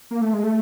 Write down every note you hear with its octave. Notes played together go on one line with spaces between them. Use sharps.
A#3
A3
G#3
A3